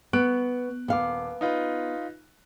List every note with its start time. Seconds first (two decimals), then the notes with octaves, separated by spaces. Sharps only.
0.13 B3 C#6 F#6 D7
0.88 D#1 B3 F5 D6
1.41 D#4 F4 B4